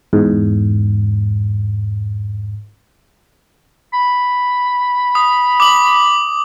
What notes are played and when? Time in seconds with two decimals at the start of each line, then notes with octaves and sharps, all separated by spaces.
0.13 E2 G#2
3.94 B5
5.15 D#6
5.60 D6 F#7